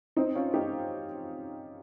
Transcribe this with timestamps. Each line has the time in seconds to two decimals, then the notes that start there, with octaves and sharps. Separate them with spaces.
0.16 C4 D#4
0.35 C#4 F4
0.54 D#4 G4